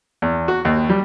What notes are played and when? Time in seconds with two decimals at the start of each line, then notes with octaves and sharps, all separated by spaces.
0.22 E2
0.48 F#4
0.65 D#2
0.90 G3